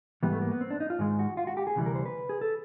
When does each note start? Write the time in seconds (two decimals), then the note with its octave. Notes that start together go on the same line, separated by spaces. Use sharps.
0.23 G#2 E3 G3 B3
0.33 A3
0.42 A#3
0.51 B3
0.61 C4
0.70 D4
0.80 D#4
0.90 F4
0.99 G#2 D#3 G#3
1.19 F#4
1.37 F4
1.47 F#4
1.57 G4
1.67 G#4
1.76 D2 C3 E3 G3
1.86 A#4
1.95 C5
2.06 B4
2.29 G#4
2.41 A4